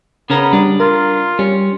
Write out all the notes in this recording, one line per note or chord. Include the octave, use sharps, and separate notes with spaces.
C#3 B3 C#4 A#4
G3 D4
F4 A#4
G3 C#4